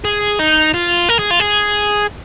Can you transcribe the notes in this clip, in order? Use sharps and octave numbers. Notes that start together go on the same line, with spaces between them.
G#4
D#4
F4
A#4
G#4
F4
G#4